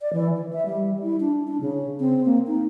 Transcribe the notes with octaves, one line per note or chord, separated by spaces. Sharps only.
D5
E3
E3
E5
G3
E4
D4
D4
C#3
C4
A#3
D#4